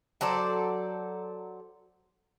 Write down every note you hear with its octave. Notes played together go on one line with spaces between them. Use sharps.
F#3 A4 C5 D5